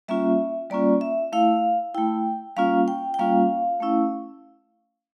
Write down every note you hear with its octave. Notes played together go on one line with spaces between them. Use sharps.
G3 A#3 C#4 F4 E5
G3 A#3 C#4 F4 D5
E5
A3 E4 F5
A3 E4 G5
G3 A#3 C#4 F4 F5
G5
G5
G3 A#3 C#4 F4 F5
A3 C#4 E4